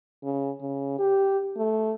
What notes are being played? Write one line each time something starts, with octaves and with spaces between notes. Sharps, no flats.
C#3
C#3
G4
A3